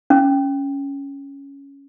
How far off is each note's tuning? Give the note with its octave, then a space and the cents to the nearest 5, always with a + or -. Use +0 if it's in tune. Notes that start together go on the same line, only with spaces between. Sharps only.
C#4 +5